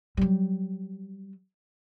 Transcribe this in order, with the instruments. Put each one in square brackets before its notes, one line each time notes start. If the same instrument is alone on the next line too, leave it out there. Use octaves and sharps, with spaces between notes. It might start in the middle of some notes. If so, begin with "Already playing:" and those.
[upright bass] F#3 G3